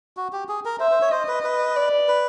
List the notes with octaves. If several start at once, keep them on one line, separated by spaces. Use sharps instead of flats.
F#4
G4
G#4
A#4
C5 E5
C5
C#5
C5 D#5
B4
B4
D5
B4